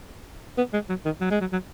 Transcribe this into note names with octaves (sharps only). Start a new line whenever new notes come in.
B3
G#3
F#3
D#3
F#3
G#3
F#3
F#3